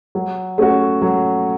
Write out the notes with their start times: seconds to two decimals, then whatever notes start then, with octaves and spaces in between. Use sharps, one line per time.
0.15 F#3
0.58 A3 C#4 F#4
1.02 F#3